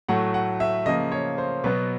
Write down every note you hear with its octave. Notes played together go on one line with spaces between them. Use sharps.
A2 F#3 A3 F#5
F#5
E5
C#3 F3 A#3 D#5
C#5
C5
B2 F#3 B3 B4